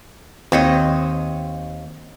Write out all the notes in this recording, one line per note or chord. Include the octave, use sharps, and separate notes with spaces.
D#2 C4 C#5 D#5